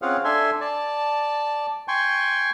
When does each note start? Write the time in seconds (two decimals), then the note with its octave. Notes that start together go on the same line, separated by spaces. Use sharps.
0.02 C4 C#4 F4 G#4 F5 F#5
0.24 D4 A4 E5 G#5 C6
0.61 D5 A5
1.88 G5 G#5 C6 C#6